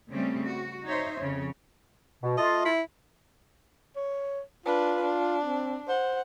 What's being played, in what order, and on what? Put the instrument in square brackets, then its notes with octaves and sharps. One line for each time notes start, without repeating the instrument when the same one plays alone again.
[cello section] C#3 G3 A3 C4 C#4
F#4
D#4 C5 C#5 E5
F2 C#3 C#5
[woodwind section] B2
[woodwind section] A3 F4 [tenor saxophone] D#5
[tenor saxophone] E4
[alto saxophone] C#5
[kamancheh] D4 B4 [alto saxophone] F4
[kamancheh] D4
[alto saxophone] C4
[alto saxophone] C5 [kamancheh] F#5